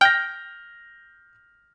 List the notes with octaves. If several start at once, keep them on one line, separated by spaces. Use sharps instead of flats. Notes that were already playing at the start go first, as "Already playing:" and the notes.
G5 F6 G6 A#6